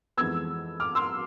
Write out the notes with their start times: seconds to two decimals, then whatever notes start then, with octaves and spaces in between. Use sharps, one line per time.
0.17 F2 E3 G#3 B3 E6 G#6
0.80 D6 F6
0.95 C6 E6